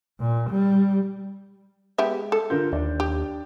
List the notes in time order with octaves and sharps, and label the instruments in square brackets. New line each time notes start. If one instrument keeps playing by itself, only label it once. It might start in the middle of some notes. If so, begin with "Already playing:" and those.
[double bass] A#2
G3
[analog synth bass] G#3 [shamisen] B3 G4 E5
[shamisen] A4
[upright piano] D3 A#4 G6 [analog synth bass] F4
[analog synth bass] D#2 [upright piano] D4 D5
[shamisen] G4